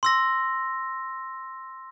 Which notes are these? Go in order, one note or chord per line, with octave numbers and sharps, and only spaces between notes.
C6 E6 A#6